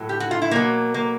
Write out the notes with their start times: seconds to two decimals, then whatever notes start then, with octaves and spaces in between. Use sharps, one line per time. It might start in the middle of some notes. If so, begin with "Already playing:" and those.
Already playing: A2 F#3
0.09 G4
0.20 F#4
0.31 F4
0.42 E4
0.51 B2 F#3 A#3
0.94 A#3